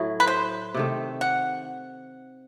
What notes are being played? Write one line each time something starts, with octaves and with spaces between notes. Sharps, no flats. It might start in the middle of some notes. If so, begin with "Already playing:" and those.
Already playing: A2 F#3 A3 E4
B4
C5
C3 D#3 A3
F#5